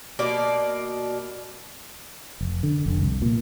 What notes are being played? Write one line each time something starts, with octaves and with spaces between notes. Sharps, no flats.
B2 A#3 D5
F1
D3
F1
C2
A#2